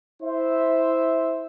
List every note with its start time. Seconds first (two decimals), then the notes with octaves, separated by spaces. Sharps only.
0.22 E4 C5 E5